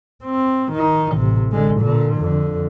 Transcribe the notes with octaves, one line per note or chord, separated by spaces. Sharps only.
C4
D#3 D#4
A1 C3
D3 G#3
A#2 D3
F2 D3